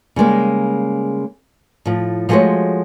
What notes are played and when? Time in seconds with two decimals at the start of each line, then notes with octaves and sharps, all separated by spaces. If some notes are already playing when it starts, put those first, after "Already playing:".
0.16 C#3 G3 G#3 A#3
1.86 A2 F3
2.29 F3 G#3 A3 F#4 C5 C#5